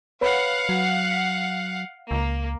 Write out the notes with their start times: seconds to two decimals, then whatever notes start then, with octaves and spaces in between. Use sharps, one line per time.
0.21 B4 C#5 F5 F#5 B5
0.69 F#3
1.12 B6
2.11 C#2 A#3